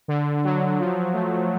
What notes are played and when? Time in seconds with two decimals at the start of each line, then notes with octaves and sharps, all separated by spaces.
0.08 D3
0.44 F#3
0.79 F3
1.14 A3